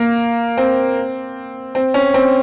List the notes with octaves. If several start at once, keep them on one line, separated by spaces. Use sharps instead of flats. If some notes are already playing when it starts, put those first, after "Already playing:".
Already playing: A#3
C4
C4
C#4
C4